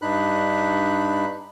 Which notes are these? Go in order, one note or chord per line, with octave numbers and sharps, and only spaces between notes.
G2 D4 D#4 B5 F#6